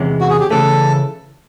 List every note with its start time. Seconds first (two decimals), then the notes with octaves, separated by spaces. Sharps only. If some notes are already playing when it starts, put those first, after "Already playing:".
Already playing: E2 C3 E3 G#3 C#4
0.21 F#4
0.30 G#4
0.40 G4
0.50 C#3 E3 A3 C#4 A4